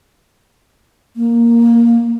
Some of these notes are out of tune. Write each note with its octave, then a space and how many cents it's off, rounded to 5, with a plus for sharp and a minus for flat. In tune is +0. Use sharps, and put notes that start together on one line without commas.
A#3 +0